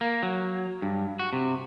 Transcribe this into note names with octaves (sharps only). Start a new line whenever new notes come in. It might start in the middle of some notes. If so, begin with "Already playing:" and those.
A#3
F#3
G2
F#4
C3